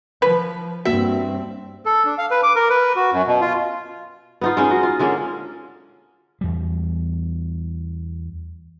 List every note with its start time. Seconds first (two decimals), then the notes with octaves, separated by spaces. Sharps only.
0.22 F3 B4
0.85 G2 A#3 C4 F#4 E5
1.86 A4
2.05 D4
2.18 F5
2.31 B4
2.43 D6
2.56 A#4
2.70 B4
2.96 F#4
3.12 F#2
3.27 B2
3.41 F4
4.41 B3 D#4 F4
4.57 G#3 C#4 D#4
4.71 F#4
4.83 F4
4.99 D3 G#3 A#3 C#4
6.41 E2 G3